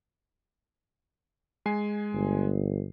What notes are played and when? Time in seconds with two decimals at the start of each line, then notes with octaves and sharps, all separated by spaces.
1.66 G#3 G#5 C7
2.14 G1